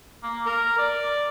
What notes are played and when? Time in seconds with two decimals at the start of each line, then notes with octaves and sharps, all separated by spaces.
0.23 A#3
0.46 A#4
0.78 D5